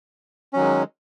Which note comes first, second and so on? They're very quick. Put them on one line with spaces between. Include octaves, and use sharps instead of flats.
C#4 F#3 D#3 G#3